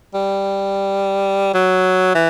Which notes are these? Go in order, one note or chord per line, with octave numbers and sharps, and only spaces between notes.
G3
F#3
E3